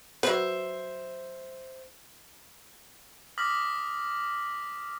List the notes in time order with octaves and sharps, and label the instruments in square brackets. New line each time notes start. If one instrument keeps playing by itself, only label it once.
[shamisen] F#3 B4 [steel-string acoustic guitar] C5 E5
[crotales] D6 D#6 F6 A#6 B6 F#7